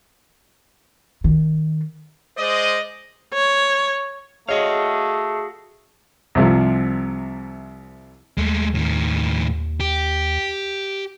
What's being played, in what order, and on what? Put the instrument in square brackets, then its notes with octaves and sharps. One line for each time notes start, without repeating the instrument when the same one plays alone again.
[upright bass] D#3
[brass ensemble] G#3 C5 D5 D#5
[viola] C#5
[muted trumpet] A3 [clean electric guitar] F#4 F5 [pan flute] G#4 [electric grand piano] C#5 D#5
[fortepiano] C2 C3 F3
[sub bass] D#2 [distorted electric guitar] G#3 A3
[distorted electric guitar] A2 D#3
G4